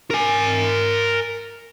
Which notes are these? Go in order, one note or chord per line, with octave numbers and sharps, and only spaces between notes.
A#4 G#5